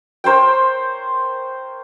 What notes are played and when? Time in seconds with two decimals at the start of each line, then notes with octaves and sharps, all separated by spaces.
0.24 A#4 C5 C#5 G5